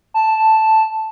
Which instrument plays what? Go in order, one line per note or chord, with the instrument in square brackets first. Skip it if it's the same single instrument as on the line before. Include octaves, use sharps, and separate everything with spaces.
[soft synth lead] A5